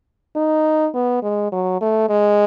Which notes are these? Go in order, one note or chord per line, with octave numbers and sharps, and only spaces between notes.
D#4
B3
G#3
F#3
A3
G#3